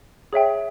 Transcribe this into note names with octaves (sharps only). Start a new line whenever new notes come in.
G#4 C#5 E5 G5